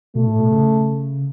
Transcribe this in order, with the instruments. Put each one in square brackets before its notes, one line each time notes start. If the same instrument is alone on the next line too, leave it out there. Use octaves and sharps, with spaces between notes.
[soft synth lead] B2 [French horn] A3
[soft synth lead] A2
B2
C#3